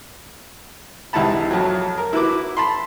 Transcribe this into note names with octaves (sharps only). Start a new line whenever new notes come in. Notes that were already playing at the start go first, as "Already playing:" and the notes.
C2 E3 G#3 F#5 A5 B5
F2 F#3
A#4
E4 F#4 B4 D6
A5 B5 C6